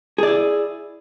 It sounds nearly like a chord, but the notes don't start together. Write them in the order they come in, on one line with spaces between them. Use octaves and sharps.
G#4 D5 E4